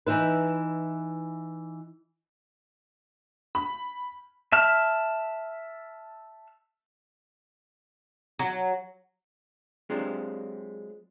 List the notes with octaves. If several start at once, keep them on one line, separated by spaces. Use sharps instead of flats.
E3 D#4 E4 B4
B5
E5 A5 F6
F#3
F#3 G#3 C4 D4 F4 G4